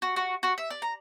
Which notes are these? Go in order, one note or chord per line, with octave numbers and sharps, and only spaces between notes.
F#4
F#4
F#4
E5
D5
A#5